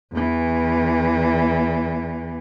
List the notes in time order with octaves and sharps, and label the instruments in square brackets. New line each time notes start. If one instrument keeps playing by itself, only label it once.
[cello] E2 E3